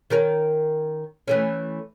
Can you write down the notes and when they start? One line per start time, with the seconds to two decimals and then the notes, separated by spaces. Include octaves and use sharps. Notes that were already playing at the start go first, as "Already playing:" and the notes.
0.10 D#3 C#4 A#4
1.28 E3 A3 C#4